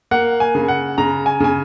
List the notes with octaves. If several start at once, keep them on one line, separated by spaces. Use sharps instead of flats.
A#3 F#5
G#5
C#3
F#5
C#3 A#5
G#5
C#3 G#5